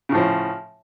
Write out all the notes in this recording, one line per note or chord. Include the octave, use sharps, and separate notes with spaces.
A2 C#3 F3